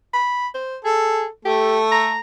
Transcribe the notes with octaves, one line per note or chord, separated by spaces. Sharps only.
B5
C5
G#4 A4
A3 G4 A4
A#5